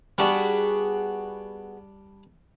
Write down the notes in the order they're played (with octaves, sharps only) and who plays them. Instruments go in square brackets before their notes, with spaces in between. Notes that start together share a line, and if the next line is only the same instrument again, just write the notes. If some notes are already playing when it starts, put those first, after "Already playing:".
[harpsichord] G3 D4 [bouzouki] B3 F#4 G#4